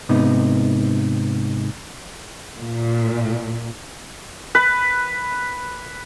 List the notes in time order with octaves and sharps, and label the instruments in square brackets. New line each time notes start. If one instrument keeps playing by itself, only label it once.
[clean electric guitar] G#2 C3 B3 D#4
[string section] A#2
[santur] B4